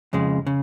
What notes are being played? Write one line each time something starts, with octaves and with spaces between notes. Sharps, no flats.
F2 C#3 G#3
C#3